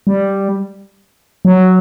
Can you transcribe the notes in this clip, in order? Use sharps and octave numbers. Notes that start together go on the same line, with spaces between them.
G3
F#3